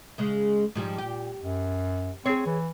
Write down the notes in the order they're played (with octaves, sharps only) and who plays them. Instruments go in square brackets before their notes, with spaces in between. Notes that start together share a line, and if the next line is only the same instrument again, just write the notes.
[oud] C#3 G#3
G#2 F3 G3
[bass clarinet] A#2 [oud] G4
[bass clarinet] F#2
[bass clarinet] C4 [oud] G#4 C#5
[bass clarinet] E3